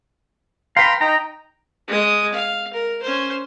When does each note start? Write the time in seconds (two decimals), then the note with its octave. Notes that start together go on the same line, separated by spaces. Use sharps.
0.77 B4 F5 G5 A#5 C6
1.01 D#4 G5 A#5
1.88 G#3 D#6
2.32 F5
2.73 A#4
3.02 C#4 C5